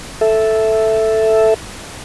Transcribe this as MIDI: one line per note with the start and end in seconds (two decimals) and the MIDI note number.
0.21 1.54 69
0.21 1.54 76